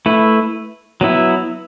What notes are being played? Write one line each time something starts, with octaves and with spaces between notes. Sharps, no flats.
A3 E4 B4
F#3 B3 E4